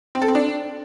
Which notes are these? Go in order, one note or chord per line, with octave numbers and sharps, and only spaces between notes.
C4
A4
C4
D4